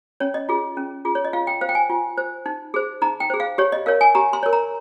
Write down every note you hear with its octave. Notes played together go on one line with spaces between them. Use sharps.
C#4 C#5
D#5
F4 G#4
C#4
F4 G#4
C#5
D#5
F4 F5
G5
C5 F5
G5
G#5
F4
C5
D#4
G#4 C5
D#4 A#5
G5
G#4 C5
F5
G4 C#5
D#5
A#4 C#5 F5
G#5
G4 A#5
C6
A#4 C#5
A#5